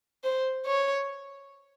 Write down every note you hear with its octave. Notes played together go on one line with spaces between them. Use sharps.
C5
C#5